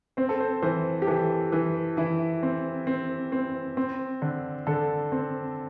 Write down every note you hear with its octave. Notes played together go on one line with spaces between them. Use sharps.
C4 C5
A4
C5
E3 C5
G4
E3 A4
E3
E3 E4
C4
C4
C4
C4
D3
D3 A4
C4